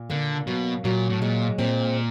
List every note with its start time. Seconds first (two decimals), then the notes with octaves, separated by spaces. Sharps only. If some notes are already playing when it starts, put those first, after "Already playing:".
Already playing: A#2
0.10 D3 A#3
0.47 B2 F#3
0.84 A#2 F#3
1.10 A2
1.21 A#2 G#3
1.58 A#2 C4